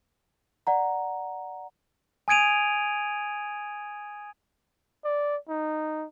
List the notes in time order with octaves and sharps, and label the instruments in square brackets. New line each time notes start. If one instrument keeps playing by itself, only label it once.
[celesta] D5 F#5 A#5
[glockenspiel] G#5 D#6 G#6 D7 D#7 F7
[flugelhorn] D5
D#4